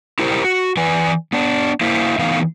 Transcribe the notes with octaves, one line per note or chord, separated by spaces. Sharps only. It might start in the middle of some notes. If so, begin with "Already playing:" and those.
E4 G4 A#4 C5
F#4
E3 B4 D5 G#5
B3 D4
A#3 E4 C5 E5 F5
E3 A3 B3 D#4 F5